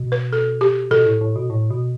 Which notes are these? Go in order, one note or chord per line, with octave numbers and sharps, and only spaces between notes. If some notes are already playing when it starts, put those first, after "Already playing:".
Already playing: B2
B4
A4
G4
B2 A4
A2
A2
B2
A2
B2